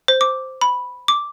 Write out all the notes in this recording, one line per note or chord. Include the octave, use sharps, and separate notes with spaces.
C5
D6
B5
D6